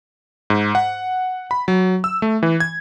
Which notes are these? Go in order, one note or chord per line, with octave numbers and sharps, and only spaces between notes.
G#2
F#5
B5
F#3
E6
A3
E3
G#6